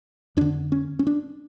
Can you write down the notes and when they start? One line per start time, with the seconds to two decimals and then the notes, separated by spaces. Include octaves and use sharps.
0.37 F2 D3 D4
0.72 C#4
0.99 C#4
1.07 D4